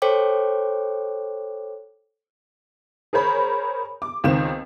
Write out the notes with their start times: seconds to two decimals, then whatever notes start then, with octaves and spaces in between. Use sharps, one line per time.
0.02 A4 C5 C#5 G5 D6
3.13 G#4 A#4 C5 C#5 B5
4.02 D6
4.24 C#2 D#3 C4 E7